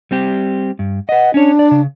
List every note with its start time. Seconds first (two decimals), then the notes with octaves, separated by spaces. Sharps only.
0.11 G3 C4 G4
0.79 G2
1.09 B4 D#5 F#5
1.34 C#4 D4 C#5
1.59 D5
1.71 C#3